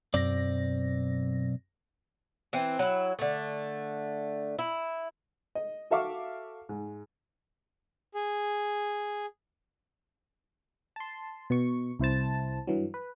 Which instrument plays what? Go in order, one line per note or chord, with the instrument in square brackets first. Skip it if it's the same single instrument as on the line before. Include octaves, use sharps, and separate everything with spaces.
[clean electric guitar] B1 C4 D5 [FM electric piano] F#2 A#6
[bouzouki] E3 C4
F#3 E4
D3 A3
E4
[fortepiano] D#5
F#4 A4 E5 F5 C#6 D6
G#2
[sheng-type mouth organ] G#4
[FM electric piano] A5 C6
B2 C#6 C#7
C2 E4 C5 A5
G2 E3 F#3
B4